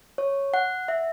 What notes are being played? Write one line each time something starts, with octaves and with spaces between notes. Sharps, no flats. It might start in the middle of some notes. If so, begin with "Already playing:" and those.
C#5
F#5
E5